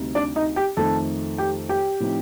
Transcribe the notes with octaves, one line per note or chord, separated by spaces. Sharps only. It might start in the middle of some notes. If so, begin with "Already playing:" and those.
Already playing: D2 C3 G3 C4 D#4
D4 D5
D#4 D#5
G4 G5
F2 D#3 A3 A4 A5
G4 G5
G4 G5
A2 F3 C4 D#4